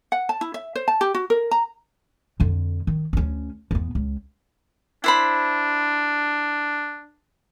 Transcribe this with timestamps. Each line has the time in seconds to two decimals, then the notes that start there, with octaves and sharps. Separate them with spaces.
0.12 F#5
0.29 A5
0.41 E4
0.54 E5
0.75 C5
0.88 A5
1.01 G4
1.14 F#4
1.30 A#4
1.51 A#5
2.40 F2 D3
2.87 D#3
3.13 D2 C#4
3.71 E2 B3
3.95 C#2
5.04 D4 E4 C5 B5